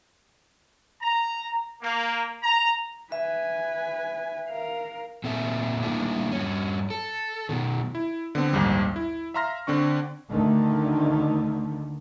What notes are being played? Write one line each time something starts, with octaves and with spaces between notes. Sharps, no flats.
A#5
A#3
A#5
B4 E5 G#5
A#4 F5
A#2 C4 A4 E5
D#3 G3 A3 A#3 D4 E4
G2 C#4
A4
B2 D#3
E4
D3 B3 C4
A#1 D#2 G#2 G3
E4
E5 F5 A#5 C6 F6 A#6
D3 C4 D4 C#6
D2 D3 D#3 A3